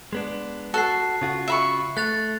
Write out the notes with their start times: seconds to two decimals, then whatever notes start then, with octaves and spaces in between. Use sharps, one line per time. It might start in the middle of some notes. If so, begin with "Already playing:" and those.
0.13 G#3 B3 D4
0.74 F#4 A4 F#6 C7
1.22 C#3 F4 F#4
1.48 E5 B5 C#6
1.97 A3 F#6 A6 F7